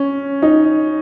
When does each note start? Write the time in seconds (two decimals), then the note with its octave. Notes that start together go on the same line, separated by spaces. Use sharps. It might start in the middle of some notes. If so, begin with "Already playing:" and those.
Already playing: C#4
0.42 D#4